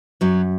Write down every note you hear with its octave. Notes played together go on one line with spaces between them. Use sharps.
F#2 F#3